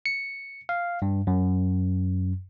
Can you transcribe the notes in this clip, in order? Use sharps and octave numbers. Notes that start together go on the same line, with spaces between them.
C#7
F5
G2
F#2